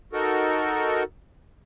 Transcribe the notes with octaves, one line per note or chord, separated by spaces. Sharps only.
D#4 F#4 A4 A#4